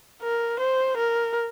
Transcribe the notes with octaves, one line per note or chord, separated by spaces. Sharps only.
A#4
C5
A#4